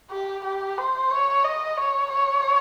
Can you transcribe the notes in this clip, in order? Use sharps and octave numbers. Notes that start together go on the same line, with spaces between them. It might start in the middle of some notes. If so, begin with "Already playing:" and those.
G4
G4
C5
C#5
D#5
C#5
C#5